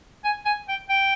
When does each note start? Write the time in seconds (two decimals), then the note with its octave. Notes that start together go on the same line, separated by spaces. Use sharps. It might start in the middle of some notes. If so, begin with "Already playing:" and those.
0.25 G#5
0.46 G#5
0.68 G5
0.89 G5